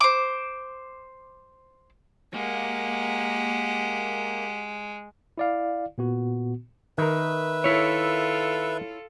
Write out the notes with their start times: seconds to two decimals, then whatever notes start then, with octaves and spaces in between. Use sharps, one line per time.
0.01 C5 D6
2.34 G#3 A#3 G4 F#5
5.38 E4 D5 F5
5.98 A#2 B3 F#4
6.98 D#3 A#4 B4 E5
7.64 E4 F4 A4 C#5